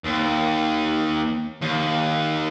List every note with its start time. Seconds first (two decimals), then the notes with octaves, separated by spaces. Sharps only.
0.05 D#2
1.61 D#2